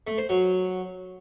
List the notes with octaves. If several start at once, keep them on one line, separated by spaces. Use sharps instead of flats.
A3
C5
F#3